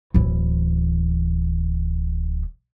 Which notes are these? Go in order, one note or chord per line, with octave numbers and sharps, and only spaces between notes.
D1 E3